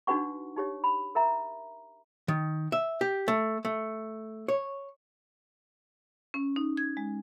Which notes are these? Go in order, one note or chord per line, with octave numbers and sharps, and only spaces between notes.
D4 D#4 F#4 B4 F#5 C#6
D#4 G4 C#5
B5
A#4 E5 A#5
D#3
E5
G4
A3
A3
C#5
C#4
D#4
G#6
G#3